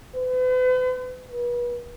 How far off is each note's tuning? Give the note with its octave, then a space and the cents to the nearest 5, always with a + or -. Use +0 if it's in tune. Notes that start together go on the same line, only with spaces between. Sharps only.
B4 +45
B4 -35